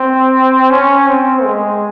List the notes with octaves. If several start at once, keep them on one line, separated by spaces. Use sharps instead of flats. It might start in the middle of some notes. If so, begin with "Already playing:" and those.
Already playing: C4
C#4
C4
G#3